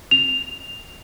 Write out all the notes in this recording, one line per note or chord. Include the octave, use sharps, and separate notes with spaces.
F7